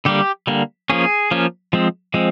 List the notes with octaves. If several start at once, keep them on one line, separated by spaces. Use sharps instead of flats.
D3 G3 A#3 G4
D3 G3 A#3
F3 A#3 C#4 G#4
F3 A#3 C#4
F3 G#3 C4
F3 G#3 C4